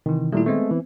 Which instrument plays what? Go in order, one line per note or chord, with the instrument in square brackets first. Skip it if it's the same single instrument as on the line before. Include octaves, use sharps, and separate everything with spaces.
[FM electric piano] C3 E3 [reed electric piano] D#3
[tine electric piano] A#2 A3 [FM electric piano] G3 E4
[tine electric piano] G#3 A3 [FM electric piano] B3 C4
[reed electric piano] E3